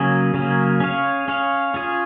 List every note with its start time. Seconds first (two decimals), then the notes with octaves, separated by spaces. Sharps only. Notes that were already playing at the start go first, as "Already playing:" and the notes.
Already playing: C#3 F#3 A#3 C#4 G#4
0.34 C#3 F#3 A#3 C#4 G#4
0.80 C#4 G#4 C#5 F5
1.28 C#4 G#4 C#5 F5
1.74 C#4 F4 G#4 C#5